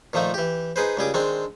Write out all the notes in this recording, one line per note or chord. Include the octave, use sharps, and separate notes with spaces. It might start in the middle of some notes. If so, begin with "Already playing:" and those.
A#2 D#3 F3 A3 D#4
E3 G4
D#4 G#4 B4 C5
C#2 G3 G#4 D6
D#3 G#3 C4 D4